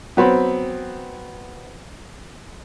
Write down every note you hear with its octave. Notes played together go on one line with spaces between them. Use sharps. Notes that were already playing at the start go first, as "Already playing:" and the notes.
F#3 B3 C4